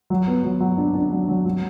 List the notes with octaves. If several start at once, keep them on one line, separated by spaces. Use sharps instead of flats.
F#3
B3
F#3
F#3
D4
D4
F#3
F#3
F#3